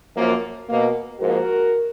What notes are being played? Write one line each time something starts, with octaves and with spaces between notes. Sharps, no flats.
F#2 F3 A#3
B2 A#3
G#2 F3 A#3 F#4 A#4